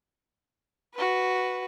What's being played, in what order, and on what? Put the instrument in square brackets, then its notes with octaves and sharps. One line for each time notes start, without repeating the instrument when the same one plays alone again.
[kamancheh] F#4 B4